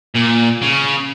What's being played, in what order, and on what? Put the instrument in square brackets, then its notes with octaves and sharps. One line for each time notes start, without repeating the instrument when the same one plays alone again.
[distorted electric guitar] A#2
C#3